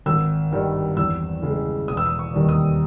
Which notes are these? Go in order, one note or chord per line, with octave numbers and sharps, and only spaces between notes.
G#1 E6
G2 D#3 G3
E2 E6
C#3 G#3
E1 D#6
E6
D#6
C#6
D#2 D#3 G3
D#6